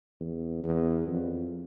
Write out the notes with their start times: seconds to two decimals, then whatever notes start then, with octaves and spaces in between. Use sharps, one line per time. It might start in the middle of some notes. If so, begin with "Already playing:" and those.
0.20 E2
0.63 E2
1.07 F2